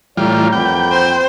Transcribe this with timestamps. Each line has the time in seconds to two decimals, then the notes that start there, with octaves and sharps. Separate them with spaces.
0.17 A2 E3 G3 F4 C#5 D5 A#5
0.53 F2 A#3 B3 G5 B5
0.91 C5